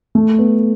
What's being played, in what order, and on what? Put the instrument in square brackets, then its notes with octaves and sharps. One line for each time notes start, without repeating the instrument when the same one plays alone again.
[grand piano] A3
B3